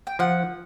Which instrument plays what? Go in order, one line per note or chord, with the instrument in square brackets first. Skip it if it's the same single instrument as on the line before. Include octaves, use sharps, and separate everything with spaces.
[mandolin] G5
[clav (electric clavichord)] F3 [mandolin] F#5